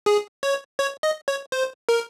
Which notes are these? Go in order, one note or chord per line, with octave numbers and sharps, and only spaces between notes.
G#4
C#5
C#5
D#5
C#5
C5
A#4